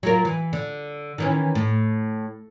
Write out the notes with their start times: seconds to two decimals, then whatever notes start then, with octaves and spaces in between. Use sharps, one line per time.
0.03 F#3 F4 A#4
0.25 E3
0.53 D3
1.18 D#3 E3 C#4
1.55 A2